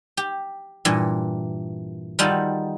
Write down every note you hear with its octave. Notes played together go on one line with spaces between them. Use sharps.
G4
G2 A#2 E3
D#3 G3 D#4 F4 F#4 A4